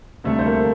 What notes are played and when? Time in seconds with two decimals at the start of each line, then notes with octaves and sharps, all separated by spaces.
0.24 D2 C3 G3 A3 A4
0.39 C5
0.46 A#3 A#4